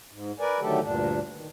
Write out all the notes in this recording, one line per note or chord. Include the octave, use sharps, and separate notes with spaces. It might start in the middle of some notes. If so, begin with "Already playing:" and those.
G#2
A#4 B4 D5 G#5
D3 D#3 F#3 A3 G4 A4
D2 G2 A#2 D4
D#3